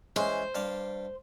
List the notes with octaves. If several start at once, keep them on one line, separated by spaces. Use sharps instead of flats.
E3 G#3 C#4 C5
G2 D5 F5